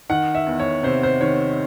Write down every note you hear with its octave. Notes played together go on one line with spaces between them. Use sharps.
D#3 F#5
E5
E2
C#5
C3 C5
C5
D#3 C#5